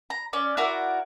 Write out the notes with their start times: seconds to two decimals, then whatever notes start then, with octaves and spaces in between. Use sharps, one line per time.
0.10 A#5
0.33 C#4 D5
0.57 E4 F#4 A#4 D5